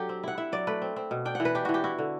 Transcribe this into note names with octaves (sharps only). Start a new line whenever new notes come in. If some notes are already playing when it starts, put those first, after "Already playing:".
Already playing: F#3 D4 G4 A4
C4
E4 F#5
E4 E5
F#3 D5
A3 B4
C4
C4
B2
D4 G5
E3 F#5
B4
D4 G4
E3 F#4
G4
E4 F#4
D3